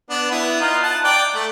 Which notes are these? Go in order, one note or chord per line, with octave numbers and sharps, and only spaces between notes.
B3 D4
B3 E4
D#4 F4
F#5 A5
D5 G5
A3